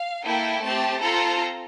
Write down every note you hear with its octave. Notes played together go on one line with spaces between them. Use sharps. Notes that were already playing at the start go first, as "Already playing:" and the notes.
Already playing: F5
A#3 E4 A4 G5
A3 C4 G4 A5
C4 F4 A4 A#5